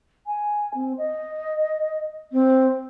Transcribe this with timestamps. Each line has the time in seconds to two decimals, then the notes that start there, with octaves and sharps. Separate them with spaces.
0.27 G#5
0.74 C4
0.98 D#5
2.32 C4